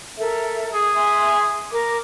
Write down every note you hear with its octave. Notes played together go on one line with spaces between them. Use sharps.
A4 A#4 E5
G#4
E5 G#5 C6
A#4 D6